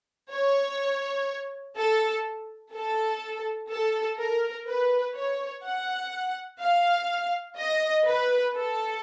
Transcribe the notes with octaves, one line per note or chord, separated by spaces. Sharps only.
C#5
A4
A4
A4
A#4
B4
C#5
F#5
F5
D#5
B4
A4